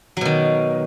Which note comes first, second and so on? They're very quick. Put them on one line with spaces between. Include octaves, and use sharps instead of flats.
F#3 B2 D#3